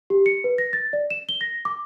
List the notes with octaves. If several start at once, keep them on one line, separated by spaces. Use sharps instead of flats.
G4
C#7
B4
A#6
A6
D5
E7
G7
A#6
D6